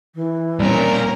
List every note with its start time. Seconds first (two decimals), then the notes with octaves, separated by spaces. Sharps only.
0.15 E3
0.59 B1 A#2 G3 C4 C#4 A#4